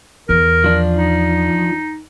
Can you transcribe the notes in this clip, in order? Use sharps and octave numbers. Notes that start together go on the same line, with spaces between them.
E2 A#4
F3 D4
D#4